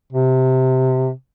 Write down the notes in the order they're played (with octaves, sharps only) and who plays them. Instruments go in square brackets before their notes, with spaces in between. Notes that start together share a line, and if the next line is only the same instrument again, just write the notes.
[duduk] C3